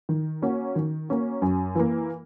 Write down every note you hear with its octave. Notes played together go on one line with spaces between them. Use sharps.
D#3
A#3 C#4 F#4
D#3
A#3 C#4 F#4
F#2
E3 A#3